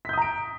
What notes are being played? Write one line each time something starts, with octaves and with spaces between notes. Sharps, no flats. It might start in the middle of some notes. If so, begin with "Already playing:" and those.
A#5 D#6 G6 B6 D7